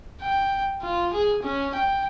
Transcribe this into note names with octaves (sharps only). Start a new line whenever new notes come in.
G5
F4
G#4
C#4
G5